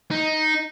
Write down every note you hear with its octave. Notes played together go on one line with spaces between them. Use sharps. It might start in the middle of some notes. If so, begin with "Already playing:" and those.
D#4